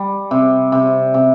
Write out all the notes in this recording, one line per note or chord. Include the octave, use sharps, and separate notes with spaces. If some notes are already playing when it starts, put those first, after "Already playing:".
Already playing: G3
C3
C3
C3